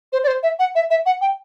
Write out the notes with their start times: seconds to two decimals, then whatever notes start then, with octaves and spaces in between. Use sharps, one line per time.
0.13 C5
0.23 D5
0.27 C5
0.43 E5
0.59 F#5
0.75 E5
0.90 E5
1.06 F#5
1.21 G5